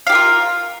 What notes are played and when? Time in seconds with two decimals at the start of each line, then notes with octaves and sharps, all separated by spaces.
0.07 F5
0.09 G4
0.12 A#4
0.15 F4